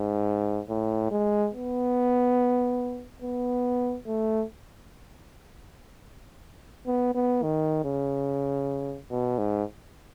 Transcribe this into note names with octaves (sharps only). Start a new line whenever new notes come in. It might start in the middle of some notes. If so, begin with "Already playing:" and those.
Already playing: G#2
A2
G#3
B3
B3
A3
B3
B3
D#3
C#3
B2
G#2